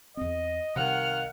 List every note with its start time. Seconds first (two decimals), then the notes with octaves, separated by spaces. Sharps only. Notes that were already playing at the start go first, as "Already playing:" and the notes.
0.17 E2 C4 D#5
0.76 C2 C3 D#3 F5 F#5 F6